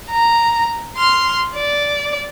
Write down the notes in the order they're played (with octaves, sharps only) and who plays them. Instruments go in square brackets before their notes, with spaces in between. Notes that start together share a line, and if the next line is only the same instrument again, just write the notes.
[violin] A#5
C6 F6
D5